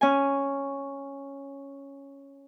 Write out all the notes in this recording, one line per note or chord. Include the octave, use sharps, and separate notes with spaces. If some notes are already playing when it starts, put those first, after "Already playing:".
C#4 G#5